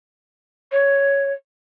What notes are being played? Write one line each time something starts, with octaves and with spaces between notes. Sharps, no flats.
C#5